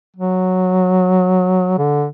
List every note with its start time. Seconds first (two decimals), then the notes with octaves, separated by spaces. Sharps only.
0.17 F#3
1.78 D3